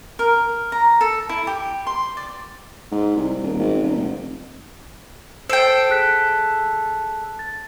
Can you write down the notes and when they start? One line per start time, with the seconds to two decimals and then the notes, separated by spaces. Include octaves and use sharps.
0.19 A#4
0.72 A#5
1.01 A4
1.29 E4
1.47 G4
1.87 C6
2.17 D5
2.91 G#2
3.16 C2
3.42 D#1
3.59 G#1
3.83 D#1
3.97 F1
5.49 A4 C5 G5 C7 D7
5.90 G#4 F#6 B6
7.39 A6